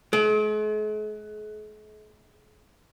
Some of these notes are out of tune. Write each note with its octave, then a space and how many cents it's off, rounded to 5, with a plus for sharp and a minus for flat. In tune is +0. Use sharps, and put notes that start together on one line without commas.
G#3 +45